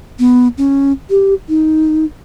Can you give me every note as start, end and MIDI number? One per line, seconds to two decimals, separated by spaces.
0.19 0.48 59
0.58 0.92 61
1.10 1.34 67
1.49 2.05 63